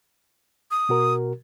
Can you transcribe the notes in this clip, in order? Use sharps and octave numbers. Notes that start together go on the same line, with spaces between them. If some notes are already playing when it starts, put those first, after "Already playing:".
D#6
B2 F#4 A#4